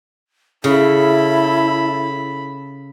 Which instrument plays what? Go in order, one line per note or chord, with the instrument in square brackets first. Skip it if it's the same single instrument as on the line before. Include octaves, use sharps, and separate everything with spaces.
[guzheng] C#3 [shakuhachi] E4 [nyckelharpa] A4 B5